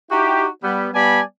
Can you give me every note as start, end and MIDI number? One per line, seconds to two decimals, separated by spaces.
0.11 0.46 63
0.11 0.46 64
0.11 0.46 66
0.11 0.46 67
0.63 0.89 55
0.63 0.89 59
0.94 1.20 55
0.94 1.20 59
0.94 1.20 74
0.94 1.20 80
0.94 1.20 81
0.94 1.20 83